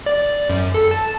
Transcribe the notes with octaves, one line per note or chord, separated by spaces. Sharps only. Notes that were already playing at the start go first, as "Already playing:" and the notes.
D5
F#2
A4
A5